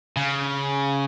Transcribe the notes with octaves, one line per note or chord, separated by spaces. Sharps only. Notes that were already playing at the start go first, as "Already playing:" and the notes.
C#3